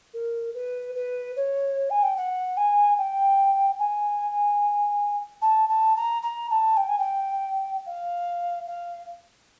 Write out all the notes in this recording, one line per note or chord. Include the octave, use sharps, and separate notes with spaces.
A#4
B4
B4
C#5
G#5
G5
F#5
G#5
G5
G#5
A5
A5
A#5
A#5
A5
G5
G#5
G5
F5
F5